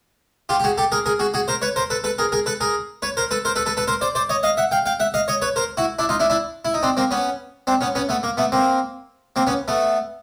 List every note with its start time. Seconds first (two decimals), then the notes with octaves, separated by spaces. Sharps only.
0.49 F4 G4
0.60 G4
0.64 F#4 G#4
0.78 G4 A4
0.92 G#4 A#4
1.06 G#4 A#4
1.19 F#4 G#4
1.34 F#4 G#4
1.48 A#4 C5
1.62 B4 C#5
1.76 A#4 C5
1.90 A4 B4
2.04 A4 B4
2.18 G#4 A#4
2.32 G#4 A#4
2.46 A4 B4
2.60 G#4 A#4
3.02 B4 C#5
3.17 A#4 C5
3.31 A4 B4
3.45 A#4 C5
3.56 A4 B4
3.66 A4 B4
3.77 A4 B4
3.88 A#4 C5
4.01 C5 D5
4.15 C5 D5
4.29 C#5 D#5
4.43 D#5 F5
4.57 E5 F#5
4.71 F5 G5
4.86 F5 G5
5.00 E5 F#5
5.14 D#5 F5
5.28 C#5 D#5
5.42 B4 C#5
5.56 A#4 C5
5.77 E4 F#4
5.99 D4 E4
6.09 D#4 F4
6.20 D4 E4
6.30 D4 E4
6.65 E4
6.74 D#4
6.83 C4 D4
6.97 A#3 C4
7.11 B3 C#4
7.67 C4 D4
7.81 B3 C#4
7.95 B3 C#4
8.09 A3 B3
8.23 A#3
8.37 A3 B3
8.52 A#3 C4
9.36 A#3 C4
9.47 B3 C#4
9.68 A3 B3